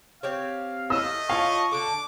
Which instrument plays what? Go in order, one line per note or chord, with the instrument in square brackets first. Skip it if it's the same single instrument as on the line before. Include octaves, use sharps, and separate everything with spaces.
[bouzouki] C4 G4 C#5 [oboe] F5
[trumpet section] A3 D#5 [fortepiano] E6
[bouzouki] F4 C#5 A5 [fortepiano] F5 [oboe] C#6
[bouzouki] D3 D4 A4 [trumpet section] D6